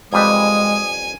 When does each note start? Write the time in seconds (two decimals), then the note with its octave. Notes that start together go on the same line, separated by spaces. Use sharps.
0.13 F2 G3 G#3 B4 G#5 D#6